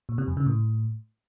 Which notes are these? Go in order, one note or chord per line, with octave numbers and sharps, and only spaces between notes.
A#2
C3
F2
C#3
A2